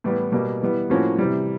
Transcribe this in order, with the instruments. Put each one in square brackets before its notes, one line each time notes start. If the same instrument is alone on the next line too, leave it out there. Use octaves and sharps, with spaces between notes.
[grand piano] A2 E3 G3 B3
B2 G3 A#3
E3 G3 B3
A2 F3 A#3 C#4 F#4
C3 E3 G3